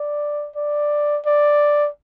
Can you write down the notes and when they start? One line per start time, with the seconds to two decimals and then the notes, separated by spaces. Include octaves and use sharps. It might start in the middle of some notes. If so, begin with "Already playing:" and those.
Already playing: D5
0.56 D5
1.26 D5